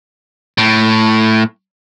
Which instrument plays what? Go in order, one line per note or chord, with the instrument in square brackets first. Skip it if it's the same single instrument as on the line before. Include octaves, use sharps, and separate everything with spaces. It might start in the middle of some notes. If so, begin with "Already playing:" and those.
[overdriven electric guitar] A2